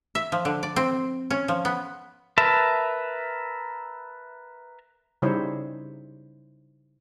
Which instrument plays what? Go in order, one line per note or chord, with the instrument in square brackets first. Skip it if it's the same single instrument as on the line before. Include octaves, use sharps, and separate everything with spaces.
[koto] E5
F3
D3
D5
C4
C#4
F3
B3
[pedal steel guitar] A#4 B4 E5 A5
[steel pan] C#3 G3 D#4 E4 C5 C#5